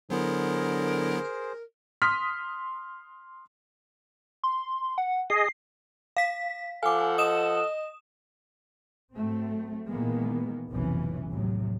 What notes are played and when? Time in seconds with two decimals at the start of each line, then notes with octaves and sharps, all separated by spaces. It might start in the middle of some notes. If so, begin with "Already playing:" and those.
0.10 D3 F#3 B3 E4 G#4 A#4 C5
2.02 C6 D#6 F6 B6
4.44 C6
4.98 F#5
5.30 G#4 D#5 C7
6.17 F5 B6
6.83 F3 A4 F5 F#5 G#5 D6
7.18 D#5 D#6 E7
9.13 G#2 F#3 A3 C4
9.88 A#2 D#3 E3 G#3 A#3 B3
10.69 F1 B1 A2 C3 E3 C#4
11.29 D#2 A2 C3 F#3